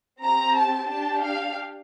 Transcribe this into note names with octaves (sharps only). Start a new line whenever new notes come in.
C4 G4 A#5
A5
D4 G4 A5
F5